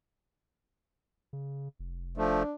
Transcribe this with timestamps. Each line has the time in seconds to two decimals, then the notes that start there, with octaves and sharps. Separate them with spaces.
1.33 C#3
1.79 F1
2.17 F3 A3 D4